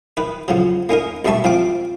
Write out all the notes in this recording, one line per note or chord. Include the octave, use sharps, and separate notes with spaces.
D#3 B4
C#3 F3 F#3
A#3 C#4 D#4 A#4
D2 B2 G3 E5 A5 C#6
F3 C4 F5 D6